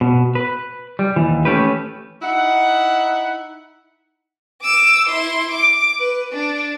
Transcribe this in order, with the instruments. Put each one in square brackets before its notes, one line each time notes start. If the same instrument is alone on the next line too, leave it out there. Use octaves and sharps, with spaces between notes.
[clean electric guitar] B2
B4
G3
D#2 E3
A3 C#4 G4 B4
[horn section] D#4 E4 F#5
[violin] D6 E6
E4 C6
D6
B4
D4